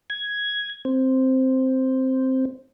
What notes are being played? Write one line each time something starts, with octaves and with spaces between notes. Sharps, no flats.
G#6
C4